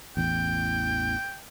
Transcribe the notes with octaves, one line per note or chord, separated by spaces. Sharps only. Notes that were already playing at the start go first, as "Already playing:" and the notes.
A1 E2 G5